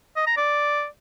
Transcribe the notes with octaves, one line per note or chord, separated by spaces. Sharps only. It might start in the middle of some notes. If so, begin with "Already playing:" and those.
D#5
A#5
D5